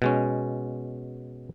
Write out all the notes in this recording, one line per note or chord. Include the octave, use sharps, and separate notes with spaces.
B2 G#3 C#4